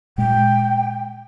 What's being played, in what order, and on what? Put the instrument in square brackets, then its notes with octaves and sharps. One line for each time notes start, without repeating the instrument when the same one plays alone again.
[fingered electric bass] A#2 G#3 [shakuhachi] G5